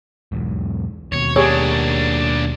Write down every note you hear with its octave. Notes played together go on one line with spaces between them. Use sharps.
B1 E2 G#2
D#2 B2 C#5
A#3 D4 G4 G#4 C#5